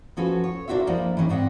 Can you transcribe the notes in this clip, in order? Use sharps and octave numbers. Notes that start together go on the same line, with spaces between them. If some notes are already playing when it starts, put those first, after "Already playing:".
F3 C#4 F#4 A4 B4 C5
C#5
A#3 D4 F4 F#4 C5 E5
F3 G3 A#3 D4 E4
E3 G3 C#4 D#4
G#2 C4 D4 D#5 F#5 G5